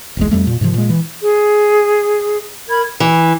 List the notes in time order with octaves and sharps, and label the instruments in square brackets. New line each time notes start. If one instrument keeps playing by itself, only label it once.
[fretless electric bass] F#1 B1 E2 G#3
F2 G3 A3
A#2
G#2 C3 D#3 F3
A#2 G#3
E3
[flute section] G#4
A#4 B5 G#6
[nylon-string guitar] E3